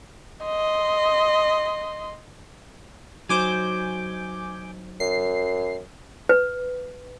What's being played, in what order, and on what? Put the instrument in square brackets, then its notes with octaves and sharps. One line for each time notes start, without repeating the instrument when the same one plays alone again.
[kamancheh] D#5 C6
[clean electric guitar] F#3 D#4 C5 [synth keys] G#5 D6 G6
[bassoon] F#2 [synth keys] C7
[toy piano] B4